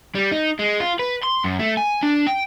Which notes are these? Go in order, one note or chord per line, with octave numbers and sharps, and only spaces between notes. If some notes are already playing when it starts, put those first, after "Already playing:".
G3
D#4
G#3
F4
B4
C6
F#2
A3
G#5
D4
G5